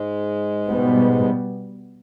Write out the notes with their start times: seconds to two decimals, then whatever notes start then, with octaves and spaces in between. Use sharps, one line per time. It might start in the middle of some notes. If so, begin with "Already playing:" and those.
Already playing: G#2 G#3
0.68 B2 G3 B3